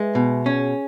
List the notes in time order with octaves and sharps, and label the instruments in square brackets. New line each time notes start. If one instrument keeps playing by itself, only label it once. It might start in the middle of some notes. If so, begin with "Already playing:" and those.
Already playing: [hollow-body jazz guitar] G#3 [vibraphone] B4 E5
[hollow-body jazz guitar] B2
[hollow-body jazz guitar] C#4 [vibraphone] G#4 C#5